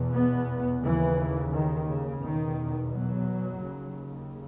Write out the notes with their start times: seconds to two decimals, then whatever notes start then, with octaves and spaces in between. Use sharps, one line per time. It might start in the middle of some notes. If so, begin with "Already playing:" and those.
Already playing: E2 B2
0.14 B3
0.83 D#2 C#3 E3
1.53 D#3
1.88 C#3
2.23 E2 B2 D#3
2.93 F#3
3.62 D#2 C#3